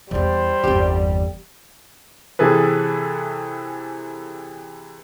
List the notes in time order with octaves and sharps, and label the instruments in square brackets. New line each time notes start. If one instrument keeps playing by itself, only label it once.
[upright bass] E2 E4 [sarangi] G3 [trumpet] C5
[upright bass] G1 E2 [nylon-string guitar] C4 G4
[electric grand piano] C3 E3 G#4 A4 B4